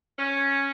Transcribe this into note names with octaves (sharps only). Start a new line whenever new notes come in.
C#4